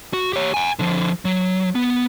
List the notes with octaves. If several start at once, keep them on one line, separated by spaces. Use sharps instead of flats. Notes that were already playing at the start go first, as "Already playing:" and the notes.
F#4
G4 C#5
F#5 G#5
D3 F3
F#3
B3